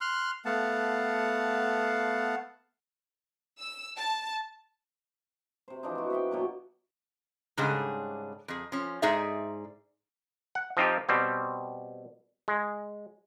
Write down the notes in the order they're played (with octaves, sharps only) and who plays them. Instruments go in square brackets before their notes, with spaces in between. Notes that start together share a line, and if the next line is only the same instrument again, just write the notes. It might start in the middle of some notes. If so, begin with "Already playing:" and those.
[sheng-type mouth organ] C6 F6 F#6
A3 B3 F5 F#5 A5
[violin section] E6
A5
[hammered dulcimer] C3 C5
E3 F3 D4 D#4
C4 F#4
B3 E5 F#5 G5
B2 F#3 A#3
[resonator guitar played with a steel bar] G#2 C#3 G3 D4 G#4
F2 G#4
F3 C#4
G#2 D#4 G#4 D5 E5
[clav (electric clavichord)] F#5
F3 C4 D#4 F4 G4
B2 G3 C4
G#3